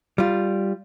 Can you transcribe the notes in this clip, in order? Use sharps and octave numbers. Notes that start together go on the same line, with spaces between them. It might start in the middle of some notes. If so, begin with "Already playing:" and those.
G3 F4